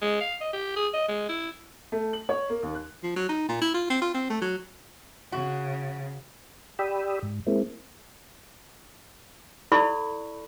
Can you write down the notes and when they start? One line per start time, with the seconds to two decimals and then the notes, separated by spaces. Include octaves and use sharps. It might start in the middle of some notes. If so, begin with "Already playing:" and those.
0.02 G#3
0.21 F5
0.41 D#5
0.53 G4
0.76 G#4
0.94 D#5
1.08 G#3
1.29 E4
1.92 A3
2.13 F#7
2.29 C#5
2.50 A#3
2.63 D#2
2.75 F#6
3.03 F3
3.16 F#3
3.29 D#4
3.49 A#2
3.61 E4
3.74 F4
3.90 C4
4.01 F4
4.14 C4
4.30 A3
4.42 F#3
5.32 C#3 F#4
6.79 G4 D5 G5 B5 D#6 E6
7.23 G#2
7.47 G#3 A#3 C4 E4
9.72 E4 A4 D5 B5 C#6